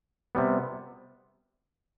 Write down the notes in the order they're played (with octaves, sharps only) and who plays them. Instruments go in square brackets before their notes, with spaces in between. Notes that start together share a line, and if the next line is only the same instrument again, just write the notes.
[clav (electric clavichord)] C3 G3 B3